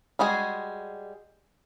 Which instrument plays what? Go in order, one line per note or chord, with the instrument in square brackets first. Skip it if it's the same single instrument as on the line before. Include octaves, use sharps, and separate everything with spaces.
[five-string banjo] G3 G#3 F#4 G#4